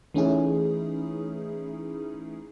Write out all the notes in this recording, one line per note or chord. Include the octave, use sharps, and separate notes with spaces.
E3 A3 C#4 D#4 E4 G#4